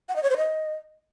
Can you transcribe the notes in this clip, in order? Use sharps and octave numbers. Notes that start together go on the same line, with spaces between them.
F#5
D#5
C#5
C5
D#5